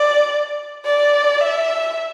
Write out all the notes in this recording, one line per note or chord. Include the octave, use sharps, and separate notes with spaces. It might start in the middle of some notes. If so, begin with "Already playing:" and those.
Already playing: D5
D5
E5